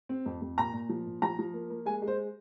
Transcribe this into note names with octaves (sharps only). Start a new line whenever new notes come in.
C4
F2
F2
A#2 A#5
A#2
F3
A#2
F3 A#5
F3
A#3
A#3
G#3 G#5
G#3
C5